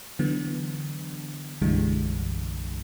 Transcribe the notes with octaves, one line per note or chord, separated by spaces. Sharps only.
D3 E3 F#3 B3
B1 F#2 D3 E3 G3 G#3